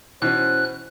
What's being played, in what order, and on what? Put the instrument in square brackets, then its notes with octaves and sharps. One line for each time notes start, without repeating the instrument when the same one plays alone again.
[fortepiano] B2 E3 [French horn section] C#4 C5 [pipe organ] F#6